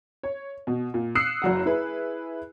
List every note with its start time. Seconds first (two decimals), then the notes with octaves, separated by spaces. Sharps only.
0.23 C#5
0.67 B2
0.94 A#2
1.15 D#6 E6 F#6 C7 C#7 E7
1.42 F#1 F#3 F#5
1.66 E4 G#4 B4